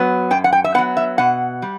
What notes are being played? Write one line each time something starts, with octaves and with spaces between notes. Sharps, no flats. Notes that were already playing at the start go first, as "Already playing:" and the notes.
Already playing: F#3 B3
F#2 G5
F#5
G5
E5
F#3 B3 F#5
E5
B2 F#5
G3